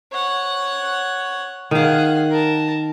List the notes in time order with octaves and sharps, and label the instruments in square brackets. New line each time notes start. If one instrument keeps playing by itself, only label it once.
[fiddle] C#5 F#5
[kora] D#3 F5 [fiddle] G#4 F#5
[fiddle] A#4 A5